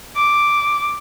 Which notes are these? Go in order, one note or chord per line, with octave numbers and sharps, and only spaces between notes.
D6